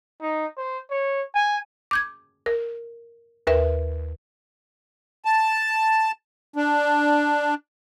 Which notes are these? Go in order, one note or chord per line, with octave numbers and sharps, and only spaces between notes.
D#4
C5
C#5
G#5
D6 G6 G#6
A#4
D#2 A#4 B4 E5
A5
D4